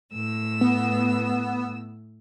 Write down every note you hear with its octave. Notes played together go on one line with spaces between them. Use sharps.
A2 E6
B3